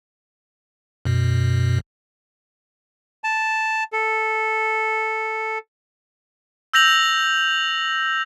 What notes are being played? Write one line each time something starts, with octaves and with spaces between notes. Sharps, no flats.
F#2 B2
A5
A4
E6 G6 A#6 F7 F#7